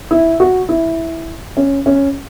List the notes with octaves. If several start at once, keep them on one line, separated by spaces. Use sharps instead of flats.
E4
F#4
E4
C#4
C#4